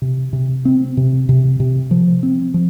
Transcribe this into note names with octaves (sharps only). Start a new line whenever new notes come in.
C3
C3
C4
C3
C3
C3
F3
C4
F3